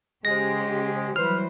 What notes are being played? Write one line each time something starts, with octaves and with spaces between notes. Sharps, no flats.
C#3 G#3 G4 C5 A#6
E3 F#3 G3 B4 C5 F6